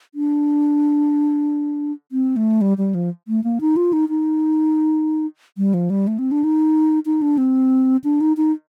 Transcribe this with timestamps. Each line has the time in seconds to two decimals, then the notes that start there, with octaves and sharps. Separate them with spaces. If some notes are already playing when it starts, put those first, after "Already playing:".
0.15 D4
2.12 C4
2.36 A3
2.61 G3
2.78 G3
2.95 F3
3.28 A3
3.44 A#3
3.61 D#4
3.76 F4
3.93 D#4
4.09 D#4
5.58 G3
5.74 F3
5.90 G3
6.07 A3
6.19 C4
6.31 D4
6.44 D#4
7.06 D#4
7.22 D4
7.38 C4
8.04 D4
8.21 D#4
8.37 D#4